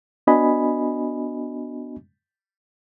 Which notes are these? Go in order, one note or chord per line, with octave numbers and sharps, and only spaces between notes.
B3 D4 F#4 D#5 G#5 B5